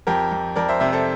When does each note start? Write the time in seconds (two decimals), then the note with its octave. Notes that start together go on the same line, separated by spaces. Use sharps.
0.07 F2 G4 A#4
0.32 F2
0.56 F2 A#4 D5
0.68 C5 E5
0.80 C3 C5 E5
0.92 A4 C5